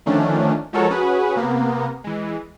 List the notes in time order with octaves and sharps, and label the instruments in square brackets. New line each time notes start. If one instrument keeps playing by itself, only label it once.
[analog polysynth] D3 D#3 F3 A3 C#4 D4
F3 G#3 F#4 A4 A#4 C#5
C#4 F#4 G#4 B4
C3 A#3 B3
E3 G#3